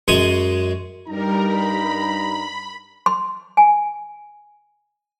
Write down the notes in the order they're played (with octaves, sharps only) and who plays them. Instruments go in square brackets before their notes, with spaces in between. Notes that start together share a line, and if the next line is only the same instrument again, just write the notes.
[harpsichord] F#2 G#3 C6 C#6 D#6
[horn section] G2 D#4 A#5 [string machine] G3 A#4
[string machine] B5
[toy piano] C6
G#5